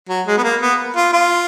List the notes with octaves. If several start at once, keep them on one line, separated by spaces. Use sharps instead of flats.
F#3
G#3
B3
A#3
B3
F4
F4